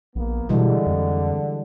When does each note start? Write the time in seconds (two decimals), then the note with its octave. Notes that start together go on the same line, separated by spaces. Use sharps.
0.15 A#1 A#3 B3
0.49 B2 D3 E3 G3 G#3
0.86 F2